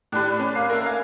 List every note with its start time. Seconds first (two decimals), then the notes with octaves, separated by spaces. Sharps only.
0.12 A2 D4 G4 B4
0.40 C#4
0.55 A#3 C7
0.70 A3 A#3 A#4
0.86 F5 G#5